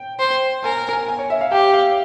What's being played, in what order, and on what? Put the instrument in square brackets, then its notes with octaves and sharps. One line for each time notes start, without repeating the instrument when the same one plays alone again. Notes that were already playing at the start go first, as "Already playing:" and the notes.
Already playing: [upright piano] G5
[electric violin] C5
[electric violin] A#4 [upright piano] G#5
[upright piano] G#5
G#5
C#5
E5
F5
[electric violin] G4 [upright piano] G5
[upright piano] F5